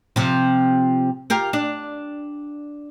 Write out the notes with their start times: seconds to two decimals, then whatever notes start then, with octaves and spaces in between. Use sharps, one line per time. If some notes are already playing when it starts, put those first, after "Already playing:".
0.16 C3 F3
1.30 F4 G4 A#4
1.53 D4